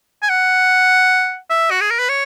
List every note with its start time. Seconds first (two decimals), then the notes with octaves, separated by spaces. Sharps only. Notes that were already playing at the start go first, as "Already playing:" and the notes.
0.22 G#5
0.29 F#5
1.50 E5
1.70 F#4
1.81 G#4
1.91 A#4
1.99 B4
2.09 C#5